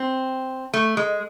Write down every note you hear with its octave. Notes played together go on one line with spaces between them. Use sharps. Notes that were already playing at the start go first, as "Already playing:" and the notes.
Already playing: C4
A3
G#3